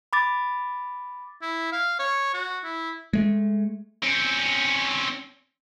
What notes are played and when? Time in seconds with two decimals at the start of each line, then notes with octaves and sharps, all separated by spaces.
0.13 B5 D6 A6
1.42 E4
1.72 F5
1.99 C#5
2.34 F#4
2.64 E4
3.13 G#3 A3
4.03 C4 C#4